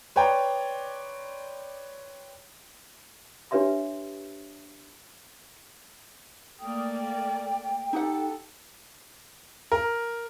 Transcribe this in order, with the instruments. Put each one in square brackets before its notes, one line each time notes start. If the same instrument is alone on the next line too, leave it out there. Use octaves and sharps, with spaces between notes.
[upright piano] B4 C#5 D5 G5 A#5 C6
[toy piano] D4 G4 B4 C#5 E5 C6
[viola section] A3 A#3 D5 [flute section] G5 D#6
[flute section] G5
[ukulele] D#4 G4 F#5 [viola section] A4
[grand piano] A#4